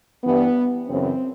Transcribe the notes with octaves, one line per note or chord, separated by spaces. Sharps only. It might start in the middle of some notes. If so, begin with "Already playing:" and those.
G2 E3 B3
F#2 C#3 E3 C4